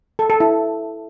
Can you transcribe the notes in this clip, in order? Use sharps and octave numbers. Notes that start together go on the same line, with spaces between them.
A4
A4
E4